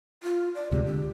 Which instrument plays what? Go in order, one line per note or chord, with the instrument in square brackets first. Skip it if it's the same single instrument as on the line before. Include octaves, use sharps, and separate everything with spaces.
[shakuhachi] F4
D5
[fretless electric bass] D2 C3 G#3 [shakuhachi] G4
[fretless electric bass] D3 [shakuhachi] G4